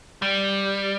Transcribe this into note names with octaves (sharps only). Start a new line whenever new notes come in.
G3